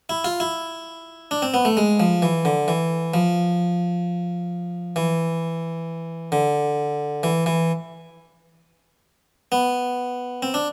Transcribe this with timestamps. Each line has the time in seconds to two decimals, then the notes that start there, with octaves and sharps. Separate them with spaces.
0.09 E4
0.24 F4
0.40 E4
1.31 D4
1.42 C4
1.54 B3
1.65 A3
1.77 G#3
2.00 F3
2.22 E3
2.45 D3
2.68 E3
3.14 F3
4.96 E3
6.32 D3
7.23 E3
7.46 E3
9.52 B3
10.43 C4
10.54 D4